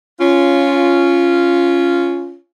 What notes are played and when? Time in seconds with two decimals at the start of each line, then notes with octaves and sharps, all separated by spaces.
0.20 C#4 F4